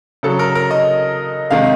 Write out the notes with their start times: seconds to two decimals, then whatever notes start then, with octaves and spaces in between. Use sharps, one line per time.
0.23 C#3 F#3 A4
0.39 A#4
0.55 A#4
0.71 D#5
1.51 C3 D#3 G#3 F5